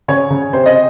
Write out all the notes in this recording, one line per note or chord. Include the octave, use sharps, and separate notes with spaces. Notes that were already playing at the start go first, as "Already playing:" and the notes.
C#3 C#5
C#3
C3 C5
D#5